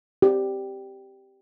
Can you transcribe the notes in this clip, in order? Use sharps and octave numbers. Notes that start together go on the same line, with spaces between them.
G4